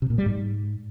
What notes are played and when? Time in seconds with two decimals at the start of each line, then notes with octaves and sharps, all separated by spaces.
0.02 C3
0.10 A#2
0.18 G3
0.26 G#2